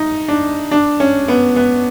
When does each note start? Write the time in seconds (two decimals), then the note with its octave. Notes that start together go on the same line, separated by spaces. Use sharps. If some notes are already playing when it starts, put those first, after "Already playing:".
Already playing: D#4
0.28 D4
0.71 D4
1.00 C#4
1.28 B3
1.56 B3